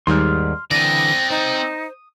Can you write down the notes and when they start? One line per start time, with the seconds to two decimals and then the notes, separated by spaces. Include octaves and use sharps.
0.07 D#2 G#2 G3 C6 F6
0.71 D3 E3 C4 D5 D#6 A#6
1.30 D#4 C5